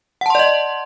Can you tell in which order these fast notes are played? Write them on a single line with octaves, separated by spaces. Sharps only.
F#5 A5 C6 D5 D#5